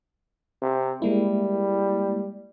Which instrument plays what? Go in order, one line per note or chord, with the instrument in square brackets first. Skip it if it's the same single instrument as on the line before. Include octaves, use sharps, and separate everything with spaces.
[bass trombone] C3
[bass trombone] G3 [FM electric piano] G#3 A#3 E4